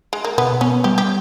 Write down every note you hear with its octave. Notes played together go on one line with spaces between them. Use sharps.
G#3
A#3
B2 B3
B3 C#4
G3 G4
G4